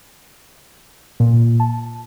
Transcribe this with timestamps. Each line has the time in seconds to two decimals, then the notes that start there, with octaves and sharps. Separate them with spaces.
1.20 A#2
1.60 A5